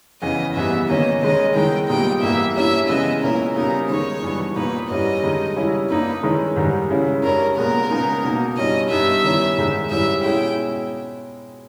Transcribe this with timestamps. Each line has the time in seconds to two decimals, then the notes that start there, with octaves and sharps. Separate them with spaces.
0.22 E2 C#3 E3 D#5
0.55 G#2 E3 G3 B3 E5
0.89 D#3 A#3 C#4 D#5
1.22 D#3 G#3 C#4 D#5
1.55 D#3 G#3 B3 E4 G5
1.89 A#2 G3 B3 D#4 G5
2.22 G#2 E3 G3 A#3 E5
2.56 G2 G3 A#3 C#4 E4 E5
2.89 C#3 E3 G#3 B3 D#5
3.23 A#2 A#3 C#4 E4 A#4
3.56 C#3 G3 B3 D#4 A#4
3.89 D#3 G#3 D#4 C#5
4.22 G2 E3 G3 B3
4.56 A#2 A#3 D#4 B4
4.90 G#2 G3 C#4 E4 D#5
5.23 G2 D#3 G#3 D#4
5.56 C#3 G3 C#4 E4
5.90 G2 G3 A#3 D#4 B4
6.23 D#3 G#3 C#4 E4
6.56 G#2 D#3 G3
6.90 C#3 G#3 C#4 E4
7.23 G2 G3 C#4 A#4
7.57 A#2 G#3 B3 A#4
7.91 C#3 G#3 B3 D#4
8.24 B2 A#3 D#4
8.57 G2 G3 C#4 E4 D#5
8.90 G2 G3 B3 D#4 E5
9.24 D#3 G3 C#4 E4
9.58 G#2 D#3 G#3 D#4
9.91 G#2 G3 C#4 E4 E5
10.24 B2 G#3 C#4 E4 G5